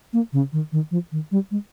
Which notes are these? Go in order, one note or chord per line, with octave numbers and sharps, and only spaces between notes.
A#3
C#3
D#3
D#3
F3
D#3
G3
G#3